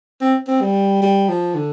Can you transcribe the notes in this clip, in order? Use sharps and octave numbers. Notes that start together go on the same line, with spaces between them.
C4
C4
G3
G3
F3
D3